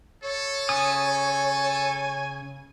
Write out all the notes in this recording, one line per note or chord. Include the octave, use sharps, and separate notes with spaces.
A4 C#5
C#3 G#5 D#6